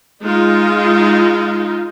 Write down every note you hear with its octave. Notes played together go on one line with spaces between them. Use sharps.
G#3 D#4 F4